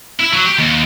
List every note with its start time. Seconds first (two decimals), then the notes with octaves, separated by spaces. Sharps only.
0.20 E4
0.33 F#3
0.45 G4
0.58 D#2